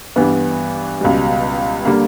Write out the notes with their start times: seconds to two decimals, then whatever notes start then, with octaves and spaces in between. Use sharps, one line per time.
0.16 G2 E3 G3 B3
1.01 C#2 B2 G3
1.85 D3 G3 A#3